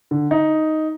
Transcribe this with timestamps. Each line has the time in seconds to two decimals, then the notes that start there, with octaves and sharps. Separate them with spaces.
0.11 D3
0.31 D#4